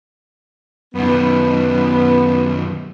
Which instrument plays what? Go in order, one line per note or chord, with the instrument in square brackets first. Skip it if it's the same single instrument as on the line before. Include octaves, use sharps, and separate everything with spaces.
[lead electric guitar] F#2 D#3 [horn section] B3